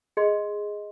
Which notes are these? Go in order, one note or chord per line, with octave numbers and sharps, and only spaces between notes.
G#4 D#5 C6